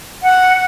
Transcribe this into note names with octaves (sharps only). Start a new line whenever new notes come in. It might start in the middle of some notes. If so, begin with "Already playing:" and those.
F#5